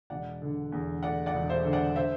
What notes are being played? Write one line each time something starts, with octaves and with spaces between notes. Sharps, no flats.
E1 D5 F#5
D3
E2
A3 D5 F#5
D5 F#5
E1
C5 E5
D3
D5 F#5
C5 E5